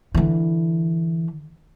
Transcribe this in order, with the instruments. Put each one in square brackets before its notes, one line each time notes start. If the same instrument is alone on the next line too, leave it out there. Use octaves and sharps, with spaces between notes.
[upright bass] D3 E3